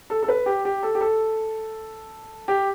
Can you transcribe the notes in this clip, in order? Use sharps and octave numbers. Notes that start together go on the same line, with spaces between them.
A4
A4
B4
G4
G4
A4
G4
A4
G4